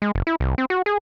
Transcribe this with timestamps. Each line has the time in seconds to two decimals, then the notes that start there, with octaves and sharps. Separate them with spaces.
0.02 G#3
0.15 F#1
0.27 E4
0.40 C2
0.58 C4
0.70 F#4
0.86 G#4